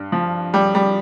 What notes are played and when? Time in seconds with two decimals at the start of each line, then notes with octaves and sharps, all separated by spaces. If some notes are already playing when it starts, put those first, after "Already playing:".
Already playing: G2
0.12 F3
0.54 G3
0.75 G3